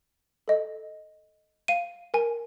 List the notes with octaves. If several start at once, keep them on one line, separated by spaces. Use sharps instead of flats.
A4 D#5
F5 D#7
A#4 G#5